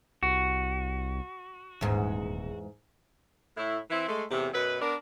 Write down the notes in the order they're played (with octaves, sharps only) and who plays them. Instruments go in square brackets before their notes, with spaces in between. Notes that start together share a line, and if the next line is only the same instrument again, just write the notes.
[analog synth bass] C2 [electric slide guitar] F#4
[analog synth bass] D#1 [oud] E2 G#2
[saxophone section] A2 E4
E3 C4 E4
G#3 A3
E2 A2 C3
F#2 B2 F#3 B4
B3 D4 A#4